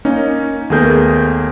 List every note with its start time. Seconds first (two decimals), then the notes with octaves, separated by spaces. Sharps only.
0.05 A#3 C#4 D#4
0.70 D#2 A3 B3 G#4 A#4 G6